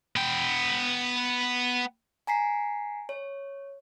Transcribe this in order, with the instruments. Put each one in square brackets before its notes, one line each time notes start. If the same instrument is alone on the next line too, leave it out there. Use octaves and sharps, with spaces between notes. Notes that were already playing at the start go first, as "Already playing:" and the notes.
[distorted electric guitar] B3 G5
[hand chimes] G#5 A#5 B6 C7
C#5